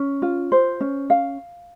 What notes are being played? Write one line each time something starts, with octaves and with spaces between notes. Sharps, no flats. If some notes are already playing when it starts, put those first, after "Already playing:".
Already playing: C#4
F4
C5
C#4
F5